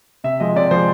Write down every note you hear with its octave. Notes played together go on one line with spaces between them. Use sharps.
C3 E5
F3 G#3 D#5
C3 D5
F3 G#3 C5